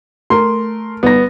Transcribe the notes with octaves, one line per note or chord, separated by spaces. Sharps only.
A3 A#4 C6
G1 B3 A#6